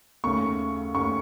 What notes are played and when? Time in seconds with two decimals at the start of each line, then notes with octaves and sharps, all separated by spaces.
0.24 D#2 C#3 A3 C#4 C#6
0.94 D#2 C#3 A3 C#4 C#6